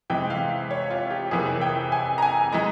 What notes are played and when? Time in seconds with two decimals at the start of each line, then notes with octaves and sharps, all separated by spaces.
0.10 C3 E3 G#3 G5
0.30 F5
0.71 C#5
0.90 F4
1.11 G4
1.31 F2 C3 E3 A#3 G#4
1.61 G5
1.92 G#5
2.18 A#5
2.22 G#5
2.52 E3 G#3 A#5